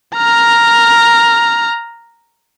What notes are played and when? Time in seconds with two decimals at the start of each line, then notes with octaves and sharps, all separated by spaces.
0.17 A#5 F6